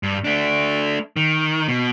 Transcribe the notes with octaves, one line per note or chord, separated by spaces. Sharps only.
G2
A3 D4
D#3
B2